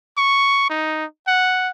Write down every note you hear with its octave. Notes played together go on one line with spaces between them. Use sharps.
C#6
D#4
F#5